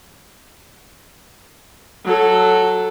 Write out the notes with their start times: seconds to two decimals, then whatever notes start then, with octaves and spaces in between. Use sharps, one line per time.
2.05 F#3 A4